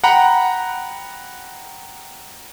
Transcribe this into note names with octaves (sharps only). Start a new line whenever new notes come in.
F#5 G5 A#5 B5